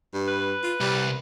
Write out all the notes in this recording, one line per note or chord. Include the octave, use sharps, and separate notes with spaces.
G2
B4
F4
C2 G3